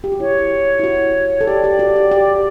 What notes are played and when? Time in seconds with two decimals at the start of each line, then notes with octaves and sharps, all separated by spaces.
0.04 G4
0.12 F#4
0.20 E4 C#5
0.79 E4
0.84 F#4
1.41 A4
1.47 G4 D5
1.64 G4
1.79 F#4
1.96 G4
2.11 G4